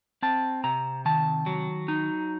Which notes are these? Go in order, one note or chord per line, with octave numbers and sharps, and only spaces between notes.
C4 A5
C3 A#5
D#3 A5
F#3
D#4